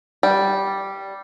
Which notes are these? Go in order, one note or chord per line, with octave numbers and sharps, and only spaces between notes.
G3